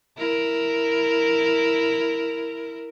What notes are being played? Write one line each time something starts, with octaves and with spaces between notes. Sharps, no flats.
E4 A#4